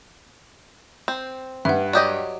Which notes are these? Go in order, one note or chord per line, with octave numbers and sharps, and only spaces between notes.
C4
G2 B4 E5 F#5
F#3 G4 D5 D#5 D#6